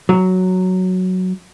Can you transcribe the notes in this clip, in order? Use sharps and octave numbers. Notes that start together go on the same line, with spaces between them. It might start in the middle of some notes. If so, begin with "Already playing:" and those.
F#3